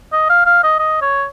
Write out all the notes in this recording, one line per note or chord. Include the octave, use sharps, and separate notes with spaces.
D#5
F5
F5
D#5
D#5
C#5